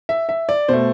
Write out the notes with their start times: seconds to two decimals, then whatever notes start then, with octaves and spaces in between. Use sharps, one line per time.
0.09 E5
0.29 E5
0.49 D5
0.68 B2 A3 C5